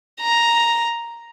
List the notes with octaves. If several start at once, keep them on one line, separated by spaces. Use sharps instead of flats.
A#5